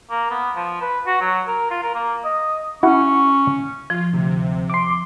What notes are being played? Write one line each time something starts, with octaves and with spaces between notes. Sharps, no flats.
A#3
B3
F3
B4
F#4
F#3
A#4
F4
A#4
A#3
D#5
C#4 E4 F#4 F#5 C#6
F3 F4
D2 C3
C6 D6